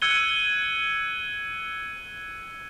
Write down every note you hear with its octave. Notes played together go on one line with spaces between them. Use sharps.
E6 F#6 G#6 C#7 D#7 G7